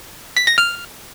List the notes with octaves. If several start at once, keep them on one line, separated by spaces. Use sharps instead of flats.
B6
A#6
F6